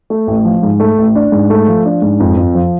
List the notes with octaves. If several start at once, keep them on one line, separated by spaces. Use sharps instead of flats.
A3
A1
F3
G#2
A3
A1
D4
G#2
A3
F3
D4
G#2
F2
F2
F3